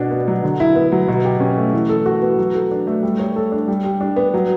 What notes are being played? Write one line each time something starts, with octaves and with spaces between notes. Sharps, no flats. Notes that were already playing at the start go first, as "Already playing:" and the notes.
Already playing: B2 D4
B3
F#3
D3
E4
B3
F#3
B2
G4
C#4
A3
E3
A4
F#4
B3
F#3
A4
D4
A3
G3
C#5
A4
D4
G3
G3
D4
B3
F#3